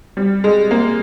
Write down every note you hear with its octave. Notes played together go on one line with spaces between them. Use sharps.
G3
G#3
A#3